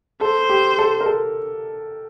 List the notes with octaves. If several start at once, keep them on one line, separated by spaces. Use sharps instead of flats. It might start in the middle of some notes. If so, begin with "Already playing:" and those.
A4 C5
G4
A4
A#4
A4